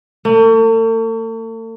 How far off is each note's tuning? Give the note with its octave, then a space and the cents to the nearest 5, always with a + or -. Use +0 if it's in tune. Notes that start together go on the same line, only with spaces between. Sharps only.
A3 +45